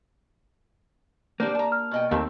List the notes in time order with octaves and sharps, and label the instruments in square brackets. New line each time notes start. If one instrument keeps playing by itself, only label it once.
[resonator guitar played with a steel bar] G3 D4 C5 [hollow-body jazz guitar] A#3
[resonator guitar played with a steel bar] A5 A#5
[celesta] F6
[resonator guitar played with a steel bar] B2 D#5 G5
[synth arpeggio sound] D#2 [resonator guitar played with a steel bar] A3 C4